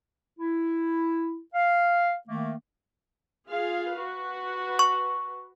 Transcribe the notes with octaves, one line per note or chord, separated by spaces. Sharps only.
E4
F5
D#3 A3 A#3
F4 G#4 F5
F#4 B4
C#6